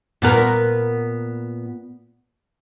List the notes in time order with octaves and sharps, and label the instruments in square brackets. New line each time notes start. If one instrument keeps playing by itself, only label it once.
[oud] A#2 B3 A#4